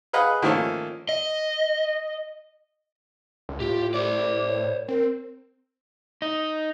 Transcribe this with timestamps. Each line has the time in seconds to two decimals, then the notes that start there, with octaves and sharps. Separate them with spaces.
0.13 G#4 B4 D#5 F5 F#5
0.42 D#3 F3 A3 A#3 C#4
1.09 D#5
3.49 C#2
3.60 A2 F4 G4
3.94 C5 D5 D6
4.48 C#5
4.88 C4 A#4
6.22 D#4